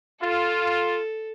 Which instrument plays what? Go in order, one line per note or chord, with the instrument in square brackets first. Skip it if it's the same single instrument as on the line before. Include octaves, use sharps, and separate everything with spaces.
[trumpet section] F4 [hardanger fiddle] A4